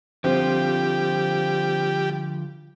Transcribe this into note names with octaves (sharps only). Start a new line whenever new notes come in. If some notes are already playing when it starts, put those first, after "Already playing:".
D3 F3 G3 C4 F4 G4